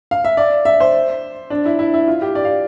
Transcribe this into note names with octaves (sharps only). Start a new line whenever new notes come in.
F5
E5
D5
E5
C5
D4
E4
E4
E4
F4
G4
D5
F5